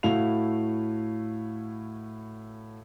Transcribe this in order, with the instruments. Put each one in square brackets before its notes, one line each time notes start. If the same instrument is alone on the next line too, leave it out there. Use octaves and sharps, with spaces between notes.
[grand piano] A2 A3 E4 F#4 F5 F7